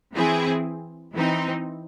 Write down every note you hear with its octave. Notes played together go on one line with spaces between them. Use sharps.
E3 C4 E4 G#4
E3 C4 D#4